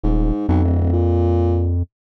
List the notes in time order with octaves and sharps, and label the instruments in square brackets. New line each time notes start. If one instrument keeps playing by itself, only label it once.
[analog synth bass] D#1 [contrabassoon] G#2
[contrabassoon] B1 [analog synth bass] F2
[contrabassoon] D1
A#2